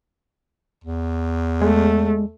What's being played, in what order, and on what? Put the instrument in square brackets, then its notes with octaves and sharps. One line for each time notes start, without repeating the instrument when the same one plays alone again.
[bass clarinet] E2
[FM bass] G#3 [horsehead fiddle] A3